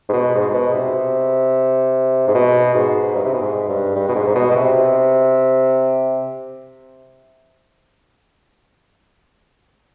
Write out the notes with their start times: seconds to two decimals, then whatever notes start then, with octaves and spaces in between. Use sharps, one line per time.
0.08 G#2
0.13 B2
0.34 G#2
0.49 G#2
0.54 B2
0.73 C3
2.27 G#2
2.34 B2
2.74 G#2
3.15 G2
3.24 C3
3.34 B2
3.42 G#2
3.69 G2
3.95 G2
4.08 B2
4.15 G#2
4.27 G#2
4.35 B2
4.50 B2
4.56 C3